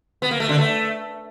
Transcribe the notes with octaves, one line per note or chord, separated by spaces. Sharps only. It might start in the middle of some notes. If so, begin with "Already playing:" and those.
B3
A#3
A3
D3
A3